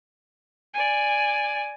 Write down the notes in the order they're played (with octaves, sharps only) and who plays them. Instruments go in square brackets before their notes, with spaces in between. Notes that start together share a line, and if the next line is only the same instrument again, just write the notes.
[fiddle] D5 G#5